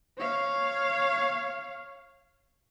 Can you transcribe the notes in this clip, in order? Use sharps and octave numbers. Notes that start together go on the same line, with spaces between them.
C#5 F5